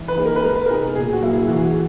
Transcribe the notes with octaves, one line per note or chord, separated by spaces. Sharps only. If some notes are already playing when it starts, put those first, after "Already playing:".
Already playing: E3
B4
A#3 D#4 G#4
A#4
B4
G#3 A#4
B4
B3 D#4 G#4 A#4
A#2 G#4
F#4
F#3 A#3 E4
G#4
E3 F#4
G#4
F#4